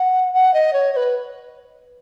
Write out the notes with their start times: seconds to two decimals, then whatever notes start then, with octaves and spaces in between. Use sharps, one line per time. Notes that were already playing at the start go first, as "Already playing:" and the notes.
Already playing: F#5
0.34 F#5
0.54 D#5
0.73 C#5
0.93 C#5
0.96 B4